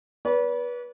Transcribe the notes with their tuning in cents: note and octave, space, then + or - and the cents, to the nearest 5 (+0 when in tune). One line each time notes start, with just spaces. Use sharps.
B4 -25 D5 -45